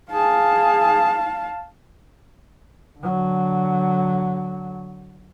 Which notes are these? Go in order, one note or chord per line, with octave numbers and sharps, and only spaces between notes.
G#4 F5 A5
D3 F#3